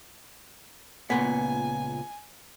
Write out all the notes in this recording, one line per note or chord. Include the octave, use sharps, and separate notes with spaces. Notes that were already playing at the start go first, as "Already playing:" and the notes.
C#2 A#2 B3 G#5